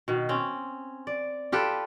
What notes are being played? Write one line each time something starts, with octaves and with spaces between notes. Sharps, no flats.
B2 D#3
C4 C#4
D5
F4 G4 A4 B4